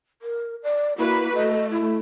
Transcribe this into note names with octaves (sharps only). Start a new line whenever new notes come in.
A#4
D5
A#3 E4 F#4 B4
A3 D#5
E4